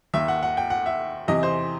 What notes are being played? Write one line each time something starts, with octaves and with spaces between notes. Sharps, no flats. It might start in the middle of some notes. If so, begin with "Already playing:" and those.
D#2 D#3 E5
F#5
F#5
G5
F#5
E5
E2 C3 E3 D#5
C5